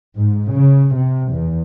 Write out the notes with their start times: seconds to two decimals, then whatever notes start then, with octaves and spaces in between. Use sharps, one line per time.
0.16 G#2
0.52 C#3
0.94 C3
1.31 E2